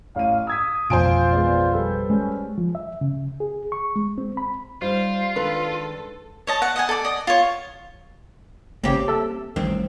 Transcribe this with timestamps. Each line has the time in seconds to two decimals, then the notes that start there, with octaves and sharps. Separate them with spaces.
0.16 A1 F5 D#7
0.47 D#6 E6 G#6 B6
0.90 A1 F2 B2 F4 C5 G#5 D7
1.32 G#3 B3 D5
1.73 G3 A4 B4
2.10 G#3 C#4
2.58 F3
2.75 E5
3.01 C#3
3.40 G#4
3.72 C#6
3.96 G#3
4.18 C4
4.37 B5
4.82 G3 D#4 F4 C5
5.36 D#3 G#3 D4 A4 B4
6.47 C#5 D#5 A5
6.62 F#5
6.76 D#5 F#5 G#5
6.89 A4 D5
7.05 D#5
7.27 F4 C#5
8.84 G#1 C#3 A#3 C4 G4 C#5
9.08 A4 E5 E6
9.56 A1 D#3 G3 C4